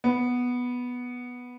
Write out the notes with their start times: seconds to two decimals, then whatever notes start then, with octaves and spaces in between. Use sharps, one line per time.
0.04 B3